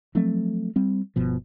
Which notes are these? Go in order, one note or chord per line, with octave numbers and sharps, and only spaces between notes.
F3 F#3 A3 C4
G3 C4
G1 B2 F3